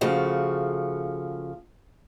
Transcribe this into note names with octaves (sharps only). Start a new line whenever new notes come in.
C#3 F3 A3 F#4